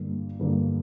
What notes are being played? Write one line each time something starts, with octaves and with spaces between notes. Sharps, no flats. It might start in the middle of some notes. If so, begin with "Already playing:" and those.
Already playing: G2 D3 A#3
G2 D3 A#3